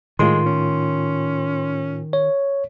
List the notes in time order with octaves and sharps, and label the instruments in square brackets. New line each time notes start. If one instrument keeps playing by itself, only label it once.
[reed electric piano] A2 F4 [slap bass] D#3 [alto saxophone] G#3 [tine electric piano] C6
[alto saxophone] C#4
[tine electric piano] C#5